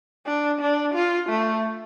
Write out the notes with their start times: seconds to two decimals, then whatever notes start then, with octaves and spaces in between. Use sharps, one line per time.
0.27 D4
0.61 D4
0.94 F4
1.29 A3